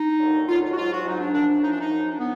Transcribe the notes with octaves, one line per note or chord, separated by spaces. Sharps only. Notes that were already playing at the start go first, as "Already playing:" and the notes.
Already playing: D#4
D#2 D3 F#3
D#2 D3 F#3 F4
F4
F#4
G#2 F#3 F4
F#4
G#2 F#3 D#4
D4
F#2 F3 D4
D4
F#2 F3 D#4
D4
D#4
F#2 F3
D4
B3